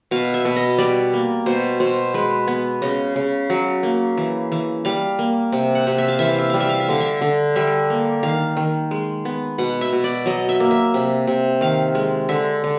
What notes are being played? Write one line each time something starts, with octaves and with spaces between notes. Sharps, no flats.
B2 F5
E5
B2
D#5
G3 D5
A#3
B2 C5
B2 C5
G#3 B4
B3
C#3 D#5
C#3
F#3
A#3
E3
E3
G3 F5
A#3
C3
F#5
C3
E5
F5
E3 E5
F5
E5
G3 F5
E5
F5
E5
D3 F5
E5
D3
G3 E5
A#3
D#3 F5
D#3
G#3
B3
B2 F#5
E5
B2
D5
F#3 D#5
E5
A#3
E5
C3
C3
D#3 F5
G#3
D3 E5
D3